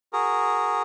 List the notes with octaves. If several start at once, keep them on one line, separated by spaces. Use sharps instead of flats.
F#4 G#4 A#4